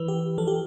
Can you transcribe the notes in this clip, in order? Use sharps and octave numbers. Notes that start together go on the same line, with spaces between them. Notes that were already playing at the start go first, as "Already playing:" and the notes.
Already playing: E3 B4
G4
F3 A4
G4